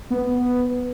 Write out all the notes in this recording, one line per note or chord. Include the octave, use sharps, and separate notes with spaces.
B3